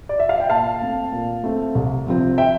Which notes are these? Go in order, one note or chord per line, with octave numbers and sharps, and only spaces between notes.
D5
E5
F5
G5
A#2 F5 A5
A3 C4
A#2
A3 C4
C2
C3 F3 C4
E5 G5